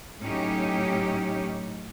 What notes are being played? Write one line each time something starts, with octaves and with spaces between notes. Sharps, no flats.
A2 F#3 C#4 D#4 G4